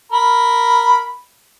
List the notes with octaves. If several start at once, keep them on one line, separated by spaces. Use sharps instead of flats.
A#4 B5